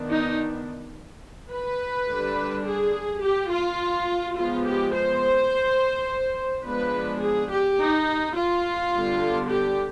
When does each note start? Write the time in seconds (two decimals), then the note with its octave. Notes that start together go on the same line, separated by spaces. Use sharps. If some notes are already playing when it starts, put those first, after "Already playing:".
Already playing: D#3 B3 D4
0.08 D#4
1.51 B4
2.09 D3 G3 D4
2.65 G#4
3.23 G4
3.51 F4
4.36 F3 G#3 B3 F4
4.66 G4
4.94 C5
6.65 F3 G#3 B3 D4 B4
7.22 G#4
7.51 G4
7.79 D#4
8.36 F4
8.93 D3 G3 B3 D4
9.50 G4